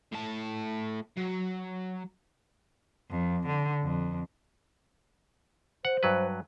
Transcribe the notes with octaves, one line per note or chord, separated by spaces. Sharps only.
A2 A5
F#3
F2
D3
F2
C5 F#5
G2 F#3 B4